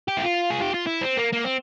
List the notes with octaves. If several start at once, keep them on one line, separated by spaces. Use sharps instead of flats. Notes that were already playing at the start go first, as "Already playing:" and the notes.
G4
E4
F4
G#4
G4
F4
E4
C4
A#3
A#3
C4